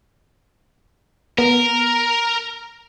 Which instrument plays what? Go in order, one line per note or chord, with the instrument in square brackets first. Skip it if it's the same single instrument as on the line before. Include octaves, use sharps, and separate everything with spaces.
[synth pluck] B3 [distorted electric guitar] A#4